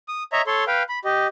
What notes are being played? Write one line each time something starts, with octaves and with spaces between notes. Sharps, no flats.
D#6
C#5 D#5 E5 A#5
A4 C#5 C6
B4 F5 G5
B5
G4 D#5